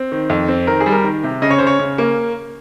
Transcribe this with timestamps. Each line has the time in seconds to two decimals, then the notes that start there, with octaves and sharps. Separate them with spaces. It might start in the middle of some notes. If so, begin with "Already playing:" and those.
Already playing: C4
0.12 D#3
0.30 F2
0.48 C4
0.67 D#3 A#4
0.81 G#4
0.86 G3
0.92 A#4
1.04 D#3
1.24 C3
1.42 C#3 D#5
1.50 C#5
1.58 C#3 C5
1.67 C#5
1.79 C#3
1.98 A#3